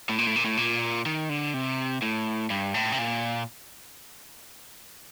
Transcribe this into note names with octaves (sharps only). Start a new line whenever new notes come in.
A2
A#2
A2
A#2
A2
A#2
D#3
D3
C3
A2
G2
A2
C3
A#2